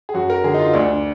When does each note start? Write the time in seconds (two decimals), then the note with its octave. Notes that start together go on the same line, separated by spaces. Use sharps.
0.09 G#4
0.14 F#2 F#4
0.30 A#4
0.44 D3 G#4
0.54 D#4
0.59 F4
0.74 D2 D4